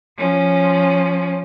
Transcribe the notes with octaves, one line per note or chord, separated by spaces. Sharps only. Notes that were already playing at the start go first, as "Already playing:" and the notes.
F3 C#4